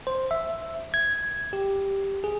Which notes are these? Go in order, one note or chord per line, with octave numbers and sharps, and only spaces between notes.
C5
E5
G#6
G4
G#4